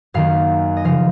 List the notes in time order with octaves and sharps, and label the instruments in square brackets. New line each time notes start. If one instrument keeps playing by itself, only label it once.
[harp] F#2 D#3 A#3 F5
D#5
C#3 F3 F5